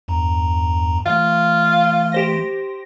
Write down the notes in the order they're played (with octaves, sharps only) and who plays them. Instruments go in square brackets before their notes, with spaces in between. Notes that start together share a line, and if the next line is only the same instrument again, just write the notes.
[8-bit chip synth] E2 G2 A#5
[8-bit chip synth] E3 A3 [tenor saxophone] F4
[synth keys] G4 C5 A#6